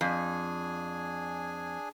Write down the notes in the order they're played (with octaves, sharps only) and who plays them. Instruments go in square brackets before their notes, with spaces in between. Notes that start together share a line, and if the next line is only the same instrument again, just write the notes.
[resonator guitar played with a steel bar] F2 [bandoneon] D4 G#4 G#5